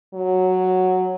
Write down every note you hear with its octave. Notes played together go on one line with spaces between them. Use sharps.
F#3